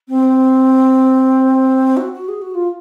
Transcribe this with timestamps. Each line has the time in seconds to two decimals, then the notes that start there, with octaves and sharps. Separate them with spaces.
0.08 C4
1.96 F#4
2.12 F#4
2.28 G#4
2.41 F#4
2.54 F4